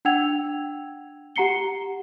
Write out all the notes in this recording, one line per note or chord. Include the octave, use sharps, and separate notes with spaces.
D4 F#5 G5 E6 G#6 F7
G4 F#5 A#5 C7 C#7 G7